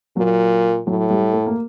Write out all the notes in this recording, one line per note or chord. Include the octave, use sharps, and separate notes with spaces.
A#2 F#3
A2 F#3
G3
A3
A#3